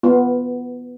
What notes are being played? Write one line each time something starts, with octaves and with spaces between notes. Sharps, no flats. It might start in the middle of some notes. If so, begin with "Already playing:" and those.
B3 F4